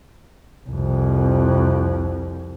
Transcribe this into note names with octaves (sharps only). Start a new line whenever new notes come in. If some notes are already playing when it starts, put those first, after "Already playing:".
C2 F2